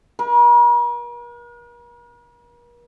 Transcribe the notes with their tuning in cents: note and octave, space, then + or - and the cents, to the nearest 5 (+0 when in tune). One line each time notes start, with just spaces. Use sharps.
A#4 +45